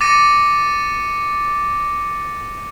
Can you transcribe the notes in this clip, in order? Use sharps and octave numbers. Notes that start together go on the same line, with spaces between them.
D6 A6 A#6 C#7 D#7